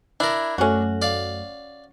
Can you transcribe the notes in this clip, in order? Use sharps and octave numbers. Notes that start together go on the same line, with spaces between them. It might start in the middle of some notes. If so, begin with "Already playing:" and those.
D4 E4 A#4
F#2 F#3 A3 C#4 F#4
D5 F5